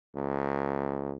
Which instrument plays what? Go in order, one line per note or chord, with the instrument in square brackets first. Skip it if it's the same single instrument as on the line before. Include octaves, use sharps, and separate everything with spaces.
[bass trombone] C#2